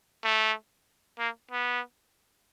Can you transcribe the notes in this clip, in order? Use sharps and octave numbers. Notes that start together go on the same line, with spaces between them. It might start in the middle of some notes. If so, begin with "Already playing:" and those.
A3
A#3
B3